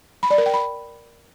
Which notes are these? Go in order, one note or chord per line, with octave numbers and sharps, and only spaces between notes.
B5
D5
A#4
G5
B5